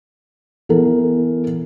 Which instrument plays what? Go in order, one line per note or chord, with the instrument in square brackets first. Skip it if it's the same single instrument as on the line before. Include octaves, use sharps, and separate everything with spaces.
[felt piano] E3 B3 A4 A#4